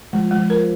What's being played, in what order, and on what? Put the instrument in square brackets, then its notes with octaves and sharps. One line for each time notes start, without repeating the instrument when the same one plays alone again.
[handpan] F3 [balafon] G#3
[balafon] G#3
[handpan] F3
[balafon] A#4